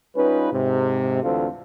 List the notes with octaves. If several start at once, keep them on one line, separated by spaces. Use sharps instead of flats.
G3 C#4 D#4 F4 B4
G#2 C3
D2 D3 E3 C4 F4 A4